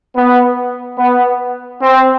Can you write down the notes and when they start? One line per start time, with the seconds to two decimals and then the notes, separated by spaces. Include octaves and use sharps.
0.15 B3
0.98 B3
1.82 C4